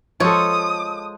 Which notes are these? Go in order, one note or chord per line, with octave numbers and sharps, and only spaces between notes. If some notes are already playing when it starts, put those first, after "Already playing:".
F3 G#3 A4 C#5 D#6